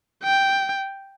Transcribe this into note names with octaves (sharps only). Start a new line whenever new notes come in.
G5